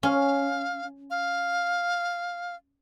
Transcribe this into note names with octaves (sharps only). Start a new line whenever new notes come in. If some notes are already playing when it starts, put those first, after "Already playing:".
C#4 F5
F5